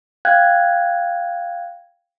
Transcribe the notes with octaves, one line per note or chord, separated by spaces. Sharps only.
F5 G5 F#6 G#6